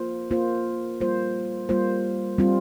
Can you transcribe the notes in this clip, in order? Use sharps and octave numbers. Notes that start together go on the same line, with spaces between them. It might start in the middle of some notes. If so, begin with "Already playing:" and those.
Already playing: A#3 F4 C5
A#3 F4 C5
G3 A#3 F4 C5
G3 A#3 F4 C5
G3 C4 F4